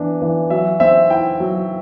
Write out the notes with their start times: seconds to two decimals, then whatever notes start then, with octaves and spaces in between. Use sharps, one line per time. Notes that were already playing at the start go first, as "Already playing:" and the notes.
Already playing: E3 B3 D4
0.22 E3
0.50 F#3 E5
0.80 C4 E5
1.10 E4 G5
1.40 F#3